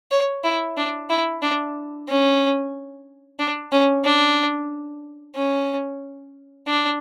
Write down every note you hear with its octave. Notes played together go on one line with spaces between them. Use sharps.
C#5
E4
D4
E4
D4
C#4
D4
C#4
D4
C#4
D4